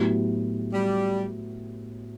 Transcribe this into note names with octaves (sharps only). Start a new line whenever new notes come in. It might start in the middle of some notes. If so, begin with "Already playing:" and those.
Already playing: A2 F#3 B3 E4 G4
G3